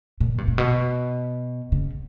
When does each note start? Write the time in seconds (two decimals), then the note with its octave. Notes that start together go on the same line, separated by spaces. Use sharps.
0.20 A#2
0.38 G2
0.48 A#2
0.58 B2
1.72 C#3